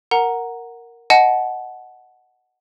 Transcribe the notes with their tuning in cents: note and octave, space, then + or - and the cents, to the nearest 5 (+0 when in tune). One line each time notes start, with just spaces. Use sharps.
A#4 +0 F#5 -5 A#5 +0
D#5 +5 F#5 +0 A5 -30